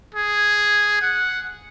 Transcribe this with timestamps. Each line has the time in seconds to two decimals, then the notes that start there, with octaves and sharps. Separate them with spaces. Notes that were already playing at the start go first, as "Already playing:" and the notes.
0.15 G#4
1.02 F#5